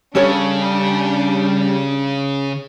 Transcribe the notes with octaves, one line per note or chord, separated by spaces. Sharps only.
C#3 G3 C#4 D4 A4 C#5